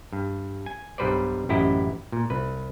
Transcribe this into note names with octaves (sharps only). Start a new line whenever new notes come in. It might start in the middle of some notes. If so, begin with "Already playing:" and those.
G2
G#5
B1 G2 G3 B4 C5 D5
A1 F#2 E4 G4 D#5
A#2
C2 B4